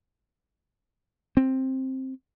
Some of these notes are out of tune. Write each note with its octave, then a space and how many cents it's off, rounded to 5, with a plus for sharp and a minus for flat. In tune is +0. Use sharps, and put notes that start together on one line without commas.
C4 +10